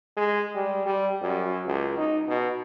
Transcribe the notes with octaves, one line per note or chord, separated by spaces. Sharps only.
G#3
G3
G3
F#2
C#2
D#4
B2